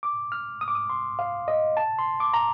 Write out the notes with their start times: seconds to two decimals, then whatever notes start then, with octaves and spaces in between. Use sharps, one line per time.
0.03 D6
0.32 F6
0.61 D#6
0.68 D6
0.75 D#6
0.90 C6
1.19 F5
1.48 D#5
1.77 A5
1.99 C6
2.20 D6
2.34 A#5